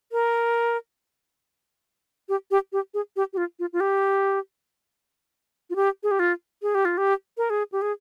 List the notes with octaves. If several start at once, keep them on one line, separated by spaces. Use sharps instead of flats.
A#4
G4
G4
G4
G#4
G4
G4
F4
F4
F4
G4
F4
G4
G#4
G4
F4
G#4
G4
F4
G4
A#4
G#4
G4
G#4